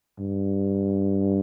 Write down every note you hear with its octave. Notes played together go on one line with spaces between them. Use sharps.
G2